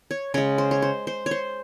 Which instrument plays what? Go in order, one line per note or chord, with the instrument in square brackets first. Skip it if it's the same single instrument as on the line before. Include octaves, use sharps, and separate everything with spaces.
[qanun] C#5
C#3 G#3 C#5
C5
C#5
C5
C5
C#5
C5